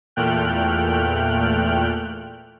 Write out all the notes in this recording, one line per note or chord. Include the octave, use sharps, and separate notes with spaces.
E2 A#2 A3 G5 F6 F#6